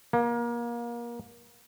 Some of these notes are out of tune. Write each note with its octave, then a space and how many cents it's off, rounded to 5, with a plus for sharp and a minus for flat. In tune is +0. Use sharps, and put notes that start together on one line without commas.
A#3 +30